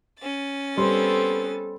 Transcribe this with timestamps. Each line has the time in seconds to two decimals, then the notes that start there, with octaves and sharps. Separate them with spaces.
0.19 C#4 A6
0.77 G3 B3 C4 A4 C6